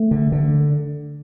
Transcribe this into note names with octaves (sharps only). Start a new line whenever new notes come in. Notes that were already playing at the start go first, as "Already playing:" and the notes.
Already playing: A3
D3
D3